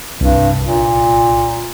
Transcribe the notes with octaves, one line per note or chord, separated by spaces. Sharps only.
C2 G2
A#2